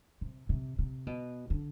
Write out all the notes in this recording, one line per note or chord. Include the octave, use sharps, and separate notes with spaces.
C3
C3
C3
B2
D3